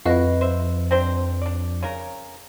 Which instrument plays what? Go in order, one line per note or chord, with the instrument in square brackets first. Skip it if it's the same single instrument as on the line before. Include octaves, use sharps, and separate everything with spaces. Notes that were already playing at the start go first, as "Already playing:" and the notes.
[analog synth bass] F2 [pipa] E4 F#4 [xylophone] B4 D#5 F5
[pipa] C5 E5
C4 D4 C5
D4 D5
C#3 A#4